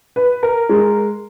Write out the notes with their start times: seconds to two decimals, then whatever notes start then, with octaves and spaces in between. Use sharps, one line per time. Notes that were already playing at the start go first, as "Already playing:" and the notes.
0.16 B4
0.43 A#4
0.69 G#3